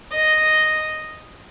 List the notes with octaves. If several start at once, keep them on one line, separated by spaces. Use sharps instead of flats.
D#5